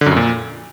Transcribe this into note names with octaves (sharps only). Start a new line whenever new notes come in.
D3
F#2
F2
A#2